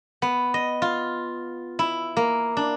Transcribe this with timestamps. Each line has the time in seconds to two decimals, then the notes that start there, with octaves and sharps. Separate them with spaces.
0.22 B3
0.54 D#5
0.82 F4
1.79 E4
2.17 A#3
2.57 D4